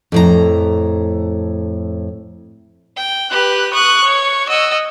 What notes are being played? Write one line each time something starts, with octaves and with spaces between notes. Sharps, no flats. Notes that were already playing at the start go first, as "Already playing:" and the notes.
F2 A2 A#5
G5
G4 B4 F#6
C#6 D#6 F#6
C#5
D#5 F#5 E6